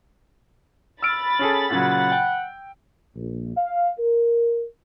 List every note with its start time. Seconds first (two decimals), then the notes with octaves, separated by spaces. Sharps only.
1.02 B5 E6 F6 A6 D7
1.39 C#4 G#4 A4
1.70 A#2 C#3 F#3 F#5
2.12 G5
3.15 A#1
3.57 F5
3.99 A#4